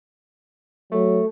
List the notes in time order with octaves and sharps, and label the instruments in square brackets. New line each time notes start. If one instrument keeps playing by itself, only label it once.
[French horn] F#3 [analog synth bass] A3